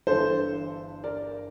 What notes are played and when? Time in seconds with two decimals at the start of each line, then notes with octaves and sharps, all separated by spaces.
0.07 G1 G2 E3 A4 C5
1.04 A#4 D5